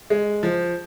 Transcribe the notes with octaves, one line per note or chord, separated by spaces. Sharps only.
G#3
F3